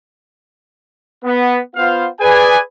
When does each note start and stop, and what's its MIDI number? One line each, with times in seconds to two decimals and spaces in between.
1.25 1.58 59
1.76 2.05 59
1.76 2.05 65
1.76 2.05 72
1.76 2.05 77
2.21 2.57 68
2.21 2.57 71
2.21 2.57 74
2.21 2.57 80